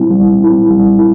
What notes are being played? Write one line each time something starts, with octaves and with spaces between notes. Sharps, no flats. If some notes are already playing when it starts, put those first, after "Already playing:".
Already playing: G3 C4 E4
G3
C4 E4
G3
E4